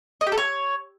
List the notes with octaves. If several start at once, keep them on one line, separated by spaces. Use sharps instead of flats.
D#5
G4
A4
C#5